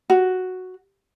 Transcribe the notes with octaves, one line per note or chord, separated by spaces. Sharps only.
F#4